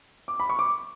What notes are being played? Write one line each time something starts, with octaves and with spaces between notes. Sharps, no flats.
D6
B5
C#6
D6